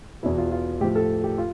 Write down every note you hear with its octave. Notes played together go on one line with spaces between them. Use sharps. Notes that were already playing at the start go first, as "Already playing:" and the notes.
E2 B2 E4
F4
F4
A2 F3 G4
A4
G4
F4